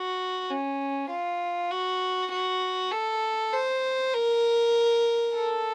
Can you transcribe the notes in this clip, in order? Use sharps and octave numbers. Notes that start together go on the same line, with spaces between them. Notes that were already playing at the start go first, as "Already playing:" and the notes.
Already playing: F#4
C#4
F4
F#4
F#4
A4
C5
A#4
A4